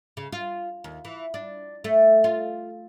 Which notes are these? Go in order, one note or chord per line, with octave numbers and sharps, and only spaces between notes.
C#3
F4
D#2
E3
D4
A3
F4